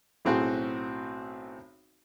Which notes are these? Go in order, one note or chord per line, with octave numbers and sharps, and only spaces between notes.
B1 A2 C4 F#4 G#4 C5